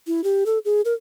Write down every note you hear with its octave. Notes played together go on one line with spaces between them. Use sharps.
E4
G4
A4
G#4
A#4